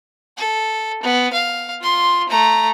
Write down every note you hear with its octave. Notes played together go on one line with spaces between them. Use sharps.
A4
B3
F5
F4 C6
A3 A#5